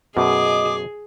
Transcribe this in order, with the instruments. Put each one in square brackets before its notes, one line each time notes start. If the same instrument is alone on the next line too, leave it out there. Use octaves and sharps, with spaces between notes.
[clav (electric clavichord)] F#2 B2 [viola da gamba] G#4 [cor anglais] D#5 [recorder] D6